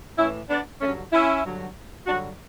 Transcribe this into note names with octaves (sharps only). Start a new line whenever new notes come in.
A2 E3 C#4 E4
B3 D4
G2 D3 F#3 A3 C#4
C#4 E4
G2 D3 F#3
G2 D3 F#3 D4 F#4